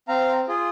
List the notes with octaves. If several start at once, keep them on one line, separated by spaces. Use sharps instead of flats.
C4 F5 A#5
F4 G#4